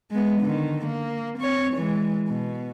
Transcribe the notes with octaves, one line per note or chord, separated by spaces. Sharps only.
G#3 B3
D3 D#3
A#3
C4 C#5
E3 G#3
B2